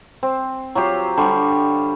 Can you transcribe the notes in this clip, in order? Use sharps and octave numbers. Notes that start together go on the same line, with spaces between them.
C4
F#3 F4 G4 C6
D3 G3 C6 C#6